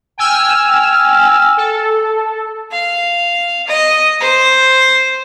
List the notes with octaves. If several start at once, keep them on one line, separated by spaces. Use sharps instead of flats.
G5 G#5 E6 F6
A4
F5
D#5
C5